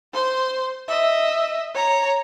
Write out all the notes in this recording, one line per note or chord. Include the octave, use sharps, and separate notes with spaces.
C5 C6
D#5 E5
C#5 A#5